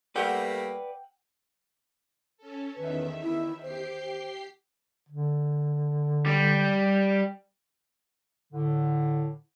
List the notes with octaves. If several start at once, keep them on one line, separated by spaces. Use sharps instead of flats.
G3 A3 A#3 B4 D5 F#5 G5 E6
C#4 A4
E2 D#3 B4 E5
E4
G4 C5 G5 C7
D3
G3
A2 D3